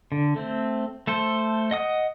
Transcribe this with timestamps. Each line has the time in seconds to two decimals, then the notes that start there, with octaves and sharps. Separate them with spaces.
0.12 D3
0.36 A3 C4
1.07 A3 A4 C5
1.71 D#5 F#5 D#6